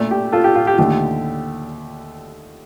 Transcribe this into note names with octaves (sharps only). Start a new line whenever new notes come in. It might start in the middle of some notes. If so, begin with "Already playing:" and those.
Already playing: A#2 A3 D4
G4
F4 A4
G4
F4
G4
D#2 D3 A3 G4